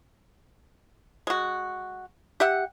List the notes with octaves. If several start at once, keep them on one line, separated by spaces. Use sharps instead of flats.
G#3 F#4
G4 E5 F#5